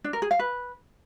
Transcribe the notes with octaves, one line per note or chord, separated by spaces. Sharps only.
D4
A#4
G#4
F5
B4